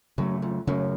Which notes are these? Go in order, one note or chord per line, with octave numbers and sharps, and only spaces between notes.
F#2 C#3 F#3 A3
F2
F#2 C#3 F#3 A3